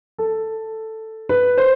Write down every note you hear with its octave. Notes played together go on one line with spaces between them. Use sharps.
A4
B4
C5